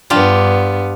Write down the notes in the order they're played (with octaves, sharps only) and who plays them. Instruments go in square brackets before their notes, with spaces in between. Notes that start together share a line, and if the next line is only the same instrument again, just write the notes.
[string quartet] G2 B3 [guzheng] D4 F4 G4